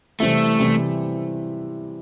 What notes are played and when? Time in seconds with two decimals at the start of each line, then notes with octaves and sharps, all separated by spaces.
0.20 C3 E3 G3 A3 C4 E4
0.59 C3 E3 G3 C4 E4